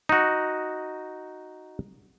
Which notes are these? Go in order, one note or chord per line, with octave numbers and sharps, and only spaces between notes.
D#4 F#4